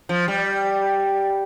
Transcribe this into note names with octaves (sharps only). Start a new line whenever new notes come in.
F3
G3